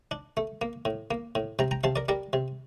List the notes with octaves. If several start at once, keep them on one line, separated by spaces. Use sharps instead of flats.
D4
A3
A#3
A2
A#3
A2
C3 G5 A#5
G5 A#5
C3 F5 A5
A#4 D5
G3 A#4 D5
C3